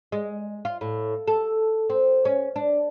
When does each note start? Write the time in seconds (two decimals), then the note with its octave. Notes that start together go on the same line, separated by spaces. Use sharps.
0.12 G#3
0.65 F4
0.81 A2
1.28 A4
1.90 C4
2.25 C#4
2.56 D4